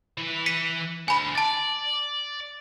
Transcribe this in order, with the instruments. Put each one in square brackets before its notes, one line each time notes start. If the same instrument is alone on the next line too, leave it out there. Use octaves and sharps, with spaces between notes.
[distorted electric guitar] E3 B4
[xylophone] B6 C#7 D#7
[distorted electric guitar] D2 [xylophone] G#5 B5
[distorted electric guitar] D5 [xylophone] A5 A6